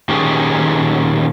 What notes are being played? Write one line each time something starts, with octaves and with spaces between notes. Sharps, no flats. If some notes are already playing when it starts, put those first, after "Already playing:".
A#2 D#3 C#4 G4 G#4